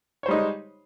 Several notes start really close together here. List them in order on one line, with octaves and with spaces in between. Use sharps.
C#5 C5 G3 D#4 G#3